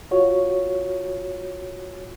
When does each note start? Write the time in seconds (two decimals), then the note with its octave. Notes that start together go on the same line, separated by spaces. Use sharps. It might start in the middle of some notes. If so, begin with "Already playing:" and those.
0.11 F4 F#4 C#5